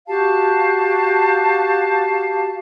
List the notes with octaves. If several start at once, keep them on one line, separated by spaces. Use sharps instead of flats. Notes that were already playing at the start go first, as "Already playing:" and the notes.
F#4 G4 F5 A5